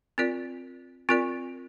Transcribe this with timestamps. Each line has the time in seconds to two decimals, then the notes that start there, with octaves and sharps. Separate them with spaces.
0.18 C4 F4 A#4 D5
1.09 C4 F4 A#4 D5